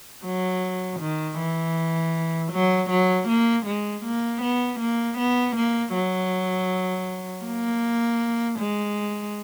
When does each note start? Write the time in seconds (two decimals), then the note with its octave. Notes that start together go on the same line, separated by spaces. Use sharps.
0.25 F#3
1.00 D#3
1.38 E3
2.52 F#3
2.90 F#3
3.28 A#3
3.66 G#3
4.04 A#3
4.42 B3
4.80 A#3
5.18 B3
5.56 A#3
5.94 F#3
7.45 A#3
8.59 G#3